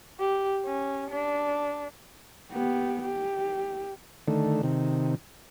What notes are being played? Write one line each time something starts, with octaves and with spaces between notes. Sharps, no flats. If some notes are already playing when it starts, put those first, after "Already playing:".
G4
C#4
D4
B3 G4
G4
D3 D#3 A3
C3 D#3